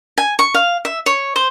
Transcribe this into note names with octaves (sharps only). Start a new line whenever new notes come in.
G#5
C#6
F5
E5
C#5
C5